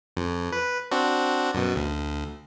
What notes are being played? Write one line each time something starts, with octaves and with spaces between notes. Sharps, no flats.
F2
B4
C4 D4 F#4
F#2 B2
D2